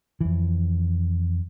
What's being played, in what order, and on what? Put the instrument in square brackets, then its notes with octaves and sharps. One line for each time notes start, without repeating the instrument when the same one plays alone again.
[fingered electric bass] F2 E3